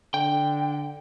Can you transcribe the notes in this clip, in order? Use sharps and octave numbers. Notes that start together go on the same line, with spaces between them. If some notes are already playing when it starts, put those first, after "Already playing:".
D3 G5